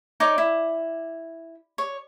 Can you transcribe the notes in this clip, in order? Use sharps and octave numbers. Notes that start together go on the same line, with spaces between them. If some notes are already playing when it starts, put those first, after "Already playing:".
D#4 C#5 D5 D6
E4
C#5